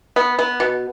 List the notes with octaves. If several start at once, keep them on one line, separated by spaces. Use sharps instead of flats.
B3
B3
B2